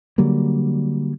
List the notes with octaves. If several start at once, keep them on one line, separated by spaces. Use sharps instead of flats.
D3 F#3 G3 A#3